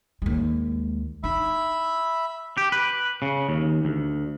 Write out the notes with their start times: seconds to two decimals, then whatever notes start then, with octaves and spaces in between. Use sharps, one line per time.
0.22 D#2 G#3
1.24 D#4 E5 B5
2.57 G4
2.72 B4
3.22 C#3
3.49 D#2
3.85 D2